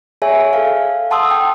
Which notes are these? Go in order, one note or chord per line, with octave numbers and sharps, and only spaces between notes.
G#4 C#5 E5 G#5
A4 F5
F#5 A5 C6 D#6 E6
G5 A5